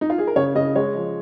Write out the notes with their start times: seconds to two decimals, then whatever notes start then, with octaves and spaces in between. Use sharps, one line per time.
0.01 D#4
0.10 F4
0.18 G#4
0.27 A#4
0.36 C#3 C#5
0.55 C#3 D#5
0.75 G#3 C#5
0.95 F3